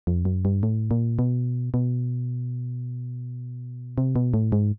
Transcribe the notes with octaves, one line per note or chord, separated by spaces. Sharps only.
F2
F#2
G2
A2
A#2
B2
B2
C3
B2
A2
G#2